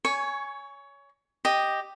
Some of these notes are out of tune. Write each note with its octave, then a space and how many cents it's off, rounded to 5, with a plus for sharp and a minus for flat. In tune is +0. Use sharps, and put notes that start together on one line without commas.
C#5 +20 G#5 +0 C#6 +0
G4 +0 D#5 +0